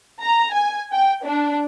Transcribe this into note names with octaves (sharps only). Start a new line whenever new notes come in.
A#5
G#5
G5
D4